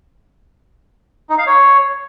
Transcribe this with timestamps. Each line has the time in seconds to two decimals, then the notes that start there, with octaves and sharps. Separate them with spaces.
1.30 D#4
1.38 F5
1.47 C#5